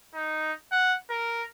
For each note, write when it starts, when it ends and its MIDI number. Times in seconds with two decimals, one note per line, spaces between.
0.14 0.53 63
0.72 0.96 78
1.10 1.44 70